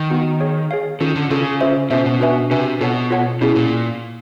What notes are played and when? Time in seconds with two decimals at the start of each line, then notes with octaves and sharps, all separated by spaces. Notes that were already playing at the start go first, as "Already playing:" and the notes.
Already playing: D#3
0.10 B3 D#4 F#4
0.40 G#4 C#5 F5
0.71 G#4 C#5 F5
1.00 D#3 C#4 F4 A4
1.16 D3
1.30 C#3 C#4 F4 A4
1.61 C#4 F4 A4 C5 E5
1.90 B2 C#4 F4 A4 C5 E5
2.06 B2
2.20 D4 F#4 B4 E5 G#5
2.51 C3 D4 F#4 B4 E5 G#5
2.81 B2 F4 A4 C#5 F#5 A5
3.11 F4 A4 C#5 F#5 A5
3.41 B2 C#4 E4 G#4
3.56 A#2